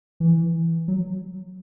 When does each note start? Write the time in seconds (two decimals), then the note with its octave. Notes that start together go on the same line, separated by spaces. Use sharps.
0.20 E3
0.88 F#3